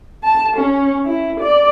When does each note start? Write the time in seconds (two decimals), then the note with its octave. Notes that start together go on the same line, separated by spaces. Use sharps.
0.23 A5
0.57 C#4
1.05 E4
1.40 D5